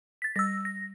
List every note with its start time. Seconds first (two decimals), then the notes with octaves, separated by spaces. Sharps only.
0.22 A6 B6
0.36 G3 E6 A#6
0.65 A#6